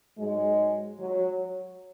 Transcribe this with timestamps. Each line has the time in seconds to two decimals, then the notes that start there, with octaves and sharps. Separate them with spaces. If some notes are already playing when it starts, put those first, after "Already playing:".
0.18 G#2 F#3 G#3
0.99 F#3